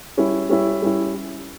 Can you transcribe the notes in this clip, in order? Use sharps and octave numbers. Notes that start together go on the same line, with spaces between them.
G3 C#4 E4
G3 C#4 E4
G3 C#4 E4